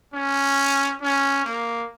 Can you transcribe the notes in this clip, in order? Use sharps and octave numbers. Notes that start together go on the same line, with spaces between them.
C#4
C#4
A#3